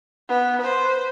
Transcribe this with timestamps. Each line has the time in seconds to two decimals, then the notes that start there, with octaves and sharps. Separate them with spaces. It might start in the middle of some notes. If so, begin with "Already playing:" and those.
0.29 B3
0.61 B4 C5